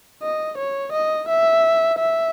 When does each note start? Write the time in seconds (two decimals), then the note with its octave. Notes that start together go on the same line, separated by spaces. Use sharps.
0.23 D#5
0.58 C#5
0.93 D#5
1.29 E5
1.99 E5